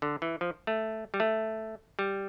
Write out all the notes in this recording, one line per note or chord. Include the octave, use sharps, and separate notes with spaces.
D3
E3
F3
A3
G3
A3
G3